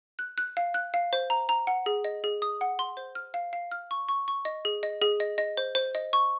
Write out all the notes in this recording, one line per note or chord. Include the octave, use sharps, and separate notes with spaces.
F#6
F#6
F5
F#6
F5
C5
A#5
A#5
F#5
G#4
D#5
G#4
D#6
F#5
C6
C5
F6
F5
F5
F6
C#6
C#6
C#6
D#5
G#4
D#5
G#4
D#5
D#5
C5
C5
D#5
C#6